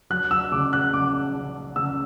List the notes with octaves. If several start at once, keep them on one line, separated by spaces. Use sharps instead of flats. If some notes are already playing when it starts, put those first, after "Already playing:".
F#3 F#6
E6
C#3 D6
F#6
C#3 D6
C#3
C#3 E6